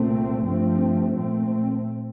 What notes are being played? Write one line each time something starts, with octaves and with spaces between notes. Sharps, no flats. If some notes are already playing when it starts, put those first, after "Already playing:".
Already playing: C2 A#2 A3 C4
G2 F3 A3 C4
A#2 A3 C4